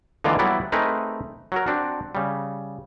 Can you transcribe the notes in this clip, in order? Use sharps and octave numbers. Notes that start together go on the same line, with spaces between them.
D3 E3 G#3 A#3 F4 D5
F#3 G3 B3 E4 D5 F#5
A3 C4 D#4 G#4 A#4 B4
F#3 F#4 A#4
C4 D4 F#4
C#3 G3